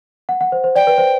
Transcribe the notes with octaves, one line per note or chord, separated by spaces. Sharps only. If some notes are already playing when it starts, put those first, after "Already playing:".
F#5
F#5
C5
C5
D5 G5
B4
C5